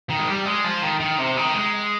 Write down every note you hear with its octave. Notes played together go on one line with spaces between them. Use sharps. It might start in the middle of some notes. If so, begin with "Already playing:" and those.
D#3
G#3
G3
G#3
F3
D#3
D#3
C3
D#3
G#3